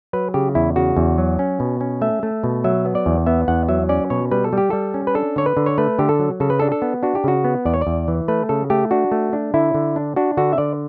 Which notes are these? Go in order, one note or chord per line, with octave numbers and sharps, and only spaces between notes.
F#3 B4
C#3 G4
E2 E4
C#3 F#4
E2
F#3
C#4
B2
C#4
A3 E5
A3
B2
F#3 E5
B3
D5
E2
B3 E5
E2 F#5
F#3 E5
C#4 D5
B2 C#5
G3 B4
A4
G3 G4
G3 A4
C#4
B4
D4 A4
D3 C#5
B4
D3
C#5
A3 B4
D3 G4
A4
F#3
C#3 A4
B4
D4 A4
A4
B3
D4 F#4
G4
C#3 F#4
B3
E2 D5
C#5
D5
E2
E3
A3 B4
C#3 A4
A3 G4
D4 F#4
A3
D4
D3 E4
D3
D4
D4 F#4
D3 F#4
E5
D3 D5